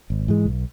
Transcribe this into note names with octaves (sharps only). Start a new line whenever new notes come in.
G#1
G#2 E3 G#3
B1